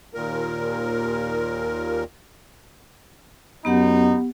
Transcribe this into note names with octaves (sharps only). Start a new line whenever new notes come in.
D#2 A#2 A#4
F#2 B3 D#4 G4 F#5